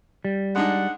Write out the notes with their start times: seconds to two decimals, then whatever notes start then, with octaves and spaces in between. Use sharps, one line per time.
0.25 G3
0.56 G#3 D4 D#4 F#5